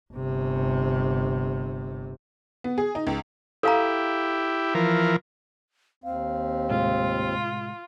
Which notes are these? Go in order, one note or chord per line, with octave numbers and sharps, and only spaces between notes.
G1 C3
B3
G#4
D#4
C#2
E4 G4 A4 F5 A#5
E3 F3 A#4
D#2 C4 F5
A2 C3 G#3 F4